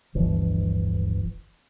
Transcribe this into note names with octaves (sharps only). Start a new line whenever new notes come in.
D1 G1 E3 F3